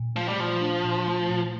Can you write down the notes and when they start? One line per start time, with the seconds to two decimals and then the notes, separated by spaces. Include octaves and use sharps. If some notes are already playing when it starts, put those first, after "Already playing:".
Already playing: A#2
0.16 F3 A3
0.28 G3
0.39 A#2 F3
0.61 D4
0.84 A#2
1.07 A3
1.30 A#2